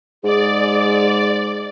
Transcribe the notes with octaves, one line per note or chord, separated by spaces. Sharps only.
G#2 G#4 D5